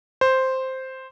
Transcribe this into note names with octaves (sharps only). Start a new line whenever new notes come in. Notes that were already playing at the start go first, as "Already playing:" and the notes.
C5